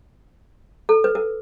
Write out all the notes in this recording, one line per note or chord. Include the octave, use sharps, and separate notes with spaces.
A4
B4
A#4